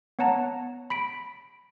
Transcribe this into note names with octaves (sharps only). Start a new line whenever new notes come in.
B3 C#5 F#5 A5 A#5
B5 B6 D7